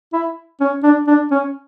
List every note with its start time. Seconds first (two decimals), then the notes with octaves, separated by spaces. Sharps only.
0.13 E4
0.61 C#4
0.83 D4
1.07 D4
1.31 C#4